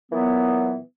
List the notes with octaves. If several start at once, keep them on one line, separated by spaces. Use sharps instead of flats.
A#2 E3 F#3 B3